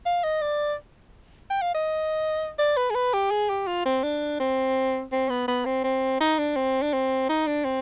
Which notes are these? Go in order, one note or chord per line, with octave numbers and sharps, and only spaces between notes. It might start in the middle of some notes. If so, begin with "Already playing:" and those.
F5
D#5
D5
G5
F5
D#5
D5
B4
G#4
B4
G4
G#4
G4
F4
C4
D4
C4
C4
B3
B3
C4
C4
D#4
D4
C4
D4
C4
D#4
D4
C4